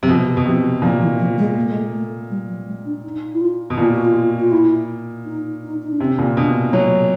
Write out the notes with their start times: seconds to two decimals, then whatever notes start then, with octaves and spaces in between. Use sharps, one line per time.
0.02 C3 F#3
0.08 B2 F3
0.37 B2
0.45 C3 F3
0.82 A#2 F3
1.01 E3
1.19 F3
1.38 G#3
1.56 A#3
1.64 A3
1.72 G#3
1.79 A3
1.94 A3
2.30 G3
2.48 F#3
2.67 G#3
2.85 D4
3.04 D#4
3.34 E4
3.41 F4
3.70 B2
3.78 A#2 F4
3.91 F#4
4.05 F4
4.40 F4
4.52 E4
5.26 D#4
5.63 D#4
5.82 D#4
5.91 D4
6.00 C3 C#4
6.19 A#2
6.37 B2 D4
6.73 F#3 A3